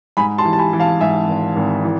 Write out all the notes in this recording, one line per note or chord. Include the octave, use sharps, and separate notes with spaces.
G#2 G#5 B5
A5 C6
E3
A5
G#5 B5
E3
F5 A5
G#2 E5 G#5
G#1
G#1
E3